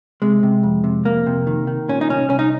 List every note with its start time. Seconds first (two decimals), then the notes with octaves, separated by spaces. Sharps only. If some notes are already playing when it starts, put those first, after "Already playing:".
0.22 C3 G#3
0.43 C3
0.63 F2
0.84 C3
1.05 F2 A#3
1.27 C3
1.47 D#3
1.67 D#3
1.89 A#2 C#4
2.01 D#4
2.10 C2 C#4
2.30 C2 C#4
2.39 D#4